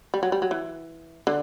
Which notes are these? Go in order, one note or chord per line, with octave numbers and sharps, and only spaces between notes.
G3
F#3
G3
F#3
E3
D3